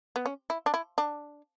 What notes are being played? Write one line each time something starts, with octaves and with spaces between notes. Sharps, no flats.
B3
C#4
E4
D4
E4
D4